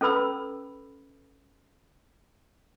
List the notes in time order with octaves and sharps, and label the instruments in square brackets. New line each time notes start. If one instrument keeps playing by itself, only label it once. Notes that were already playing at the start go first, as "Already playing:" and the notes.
[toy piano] C#4 A4 B4 B5 E6